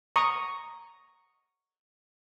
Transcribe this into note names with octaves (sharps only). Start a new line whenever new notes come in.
A#5 C#6 D#6